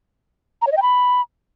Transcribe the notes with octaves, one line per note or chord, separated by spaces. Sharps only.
A#5
C#5
D#5
G5
B5